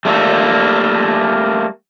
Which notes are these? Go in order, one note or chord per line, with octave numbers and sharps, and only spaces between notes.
G3 A3 A#3 G4 A4